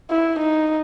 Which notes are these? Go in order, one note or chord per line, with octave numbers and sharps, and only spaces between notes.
E4
D#4